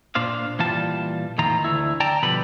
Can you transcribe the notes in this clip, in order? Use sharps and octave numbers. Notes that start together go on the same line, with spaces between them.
A#2 D4 C5 F5
A#2 E3 G3 F4 A5
E2 A2 D#3 F4 A#5
D2 A3 E4
D5 G5 A5 A#5
B2 D3 F3 G3 B4 B5